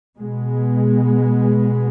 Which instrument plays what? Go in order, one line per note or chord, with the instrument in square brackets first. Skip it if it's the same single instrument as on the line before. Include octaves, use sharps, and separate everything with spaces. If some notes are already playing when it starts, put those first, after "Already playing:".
[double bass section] B2 G#3 B3